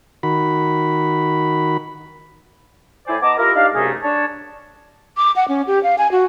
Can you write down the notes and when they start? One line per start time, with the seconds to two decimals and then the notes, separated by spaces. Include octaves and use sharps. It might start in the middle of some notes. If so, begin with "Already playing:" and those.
0.23 D#3 F#4 B5
3.07 A2 E4 C5 D5 G#5
3.22 B3 D#5 A5 A#5 D6
3.37 E4 F4 G4 A#4
3.55 D4 D#4 G4 D5 F5
3.74 C2 F#2 C3 A3 D#4 G#4
4.02 D4 C#5 A5
5.17 D6
5.36 F#5
5.48 C#4
5.67 G4
5.83 F5
5.98 G#5
6.11 F#4